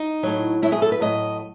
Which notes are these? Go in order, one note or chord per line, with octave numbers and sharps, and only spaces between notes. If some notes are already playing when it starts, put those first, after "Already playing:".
Already playing: D#4
A2 F#3
A2 F#3 E4
G#4
A4
B4
A2 F#3 D#5